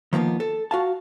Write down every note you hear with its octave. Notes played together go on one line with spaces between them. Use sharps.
D#3 F3 A#3 B3
A4
F#4 F5 A5